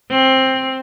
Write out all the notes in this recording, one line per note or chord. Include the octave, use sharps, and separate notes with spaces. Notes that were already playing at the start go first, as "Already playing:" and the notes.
C4